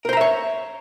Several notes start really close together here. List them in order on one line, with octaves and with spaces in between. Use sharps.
A#4 C5 A#5 E5 C#5